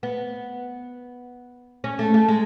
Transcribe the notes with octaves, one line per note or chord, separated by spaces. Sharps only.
B3
C#4
A3
A3
G#3